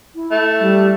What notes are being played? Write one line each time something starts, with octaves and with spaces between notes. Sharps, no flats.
E4
A3
G3